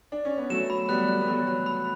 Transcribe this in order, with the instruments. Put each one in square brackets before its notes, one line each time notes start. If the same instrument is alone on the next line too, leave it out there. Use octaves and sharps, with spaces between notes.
[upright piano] D4
C#4
B3
[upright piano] F#3 A3 [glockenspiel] E7
[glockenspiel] B5
[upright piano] G3 B3 [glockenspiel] F#6
[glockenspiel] F#6
[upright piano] B3
[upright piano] F#3 A3 [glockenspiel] B5
[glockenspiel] F#6
B5